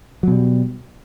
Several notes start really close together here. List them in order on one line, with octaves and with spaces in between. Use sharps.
F#3 B2 G3